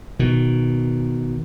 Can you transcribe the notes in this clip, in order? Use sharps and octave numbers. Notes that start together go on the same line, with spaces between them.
B2 D#3